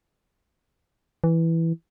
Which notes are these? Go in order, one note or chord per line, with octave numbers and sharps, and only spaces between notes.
E3